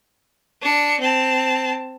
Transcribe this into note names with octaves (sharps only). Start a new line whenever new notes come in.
D4 C#7
C4 A5